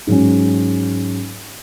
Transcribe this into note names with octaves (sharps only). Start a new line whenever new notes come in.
G#2 F#3 C#4